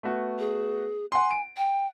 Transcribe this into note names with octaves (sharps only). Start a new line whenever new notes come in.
A3 B3 F#4
G#4
F#5 G#5 C6
D7
G5